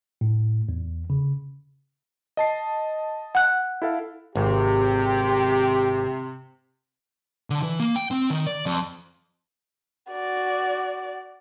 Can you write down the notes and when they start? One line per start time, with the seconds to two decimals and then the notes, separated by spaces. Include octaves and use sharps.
0.21 A2
0.69 E2
1.10 C#3
2.37 D#5 A5 C7
3.35 F#5 F#6
3.82 E4 A4 F5
4.35 G#1 C3 G4
7.50 D3
7.63 E3
7.80 A#3
7.96 G5
8.11 C4
8.30 D#3
8.47 D5
8.66 F2
10.12 F#4 D5